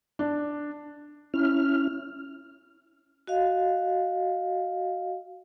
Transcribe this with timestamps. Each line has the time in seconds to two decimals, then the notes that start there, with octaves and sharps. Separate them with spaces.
0.19 D4
1.34 C#4 E4 F6
3.27 F#4 D#5 F5